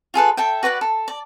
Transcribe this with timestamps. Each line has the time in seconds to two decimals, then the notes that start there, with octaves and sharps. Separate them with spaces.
0.14 F4 G#4 A4 B4
0.37 A4 E5 G5
0.63 F#4 B4 D5 F#5
0.81 A4
1.08 D5